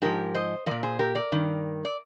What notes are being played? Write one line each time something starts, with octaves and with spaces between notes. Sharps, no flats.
G#2 F3 G4 A#4
C5 D#5
A#2 F3 A#4 D5
G#4 C5
G4 A#4
A#4 D5
G2 D#3
D5